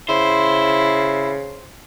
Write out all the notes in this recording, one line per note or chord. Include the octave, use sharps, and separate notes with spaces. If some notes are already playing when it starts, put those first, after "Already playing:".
C#3 E4 C5